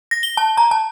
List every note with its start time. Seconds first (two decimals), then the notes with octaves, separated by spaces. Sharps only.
0.11 A#6
0.23 G7
0.37 A5
0.57 A#5
0.71 A5